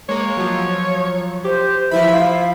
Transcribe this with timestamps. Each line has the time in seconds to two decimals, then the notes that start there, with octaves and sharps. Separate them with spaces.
0.09 G#3 A#3 C#5
0.37 F3 F#3
1.44 G4 C5
1.91 E3 F3 E4 E5 B5
2.12 C5 F5